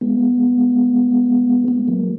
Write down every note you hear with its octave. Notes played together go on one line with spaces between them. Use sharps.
G#3 B3
G#3 B3
F#3 A#3